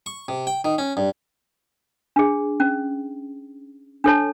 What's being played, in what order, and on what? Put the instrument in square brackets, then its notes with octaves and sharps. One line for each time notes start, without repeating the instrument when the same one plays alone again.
[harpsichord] C#6
C3
G5
D#3
C#4
G2
[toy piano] D4 G#4
C#4
D4 A4 C#5 A5